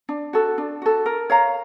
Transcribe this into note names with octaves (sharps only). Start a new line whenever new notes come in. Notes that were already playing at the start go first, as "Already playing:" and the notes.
D4
F#4 A4
D4
F#4 A4
A#4
C#5 F5 A#5